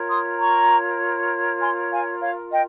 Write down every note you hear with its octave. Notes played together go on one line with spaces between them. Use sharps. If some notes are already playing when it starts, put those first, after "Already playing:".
Already playing: F4 A#4 C#5
C6 D#6
A#5 C#6
G#5 C6
F5 G#5
C#5 F5
D#5 G5